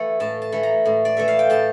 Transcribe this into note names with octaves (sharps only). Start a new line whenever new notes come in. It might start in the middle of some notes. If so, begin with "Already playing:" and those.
Already playing: E3 A3
A2 A5
A5
E3 A3
A#5
A2
D5
E3 A3 E5
F5
G5
A2 A5